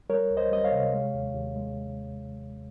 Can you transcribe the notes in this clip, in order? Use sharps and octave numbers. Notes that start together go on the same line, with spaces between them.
G3 A#4 C#5
C#2
C5 D#5
G3 D#5
C#5 F5
C3
G#3
D#2
D#2
G#3